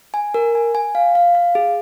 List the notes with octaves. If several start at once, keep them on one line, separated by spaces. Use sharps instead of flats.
G#5
A#4
G#5
G#5
F5
F5
F5
G#4